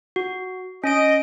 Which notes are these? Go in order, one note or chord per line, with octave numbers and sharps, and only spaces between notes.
F#4
C#4 D#5 D7